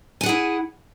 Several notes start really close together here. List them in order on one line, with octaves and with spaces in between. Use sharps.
G#5 F#5 G#4 E4